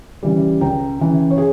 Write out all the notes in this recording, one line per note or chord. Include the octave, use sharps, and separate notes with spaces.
C#3 E3 G3
C#2 G5 A#5
C#3 E3
C#5
G#4